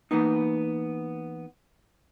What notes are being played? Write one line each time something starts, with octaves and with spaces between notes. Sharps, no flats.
E3 A#3 B3 D#4